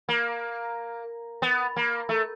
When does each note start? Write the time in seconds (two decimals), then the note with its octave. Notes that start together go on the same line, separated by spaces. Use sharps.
0.09 A#3
1.42 B3
1.76 A#3
2.09 A3